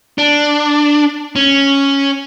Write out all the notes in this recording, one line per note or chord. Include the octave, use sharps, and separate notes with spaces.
D4
C#4